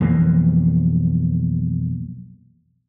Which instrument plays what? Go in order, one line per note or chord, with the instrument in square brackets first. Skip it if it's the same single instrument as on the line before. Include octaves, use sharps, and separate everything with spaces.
[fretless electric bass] B1 F2 E3 A#3